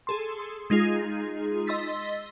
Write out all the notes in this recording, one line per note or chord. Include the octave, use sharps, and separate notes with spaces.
G#4 A4 C6
G#3 D#4 F4 G#4
D#5 C6 E6 A6 B6